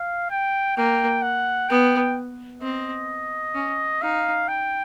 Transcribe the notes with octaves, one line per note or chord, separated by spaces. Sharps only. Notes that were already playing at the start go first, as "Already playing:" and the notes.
Already playing: F5
G5
A#3 G5
F#5
B3 G5
C4 D#5
C#4
D#4 F5
G5